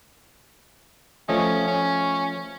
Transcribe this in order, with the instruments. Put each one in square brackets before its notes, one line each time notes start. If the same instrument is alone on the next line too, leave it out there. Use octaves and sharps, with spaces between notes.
[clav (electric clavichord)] F3 A3 D#5 [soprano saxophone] C#4
[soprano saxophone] C#4